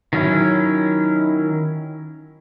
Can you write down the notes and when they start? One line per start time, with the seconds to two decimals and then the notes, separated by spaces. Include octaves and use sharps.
0.13 D#3 F#3 C#4 E4